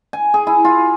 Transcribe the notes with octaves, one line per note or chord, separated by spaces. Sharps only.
G#5
G#4
E4
F4